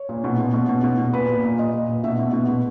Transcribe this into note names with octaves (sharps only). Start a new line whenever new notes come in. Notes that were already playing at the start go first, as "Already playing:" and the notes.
Already playing: C#5
A#2
B2
B2
B2
B2
B2
B2
A#2 B4
A#2
A#2
A#2 D#5
A#2
A#2
B2 E5
B2
B2
B2